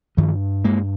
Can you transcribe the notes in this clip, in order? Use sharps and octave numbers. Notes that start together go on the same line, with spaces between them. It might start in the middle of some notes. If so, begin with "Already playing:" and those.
G2 D#3 F3
G2 G#3 A#3